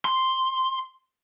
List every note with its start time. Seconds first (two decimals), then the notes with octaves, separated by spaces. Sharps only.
0.05 C6